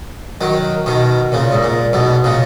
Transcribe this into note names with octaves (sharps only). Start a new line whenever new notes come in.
D#3 F#3
B2 D#3
A#2 C#3
G#2
A#2
G#2 B2
A#2 C#3